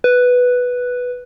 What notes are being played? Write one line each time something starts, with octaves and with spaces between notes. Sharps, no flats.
B4